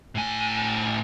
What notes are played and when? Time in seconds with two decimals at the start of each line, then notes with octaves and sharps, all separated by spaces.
0.15 A2 G#5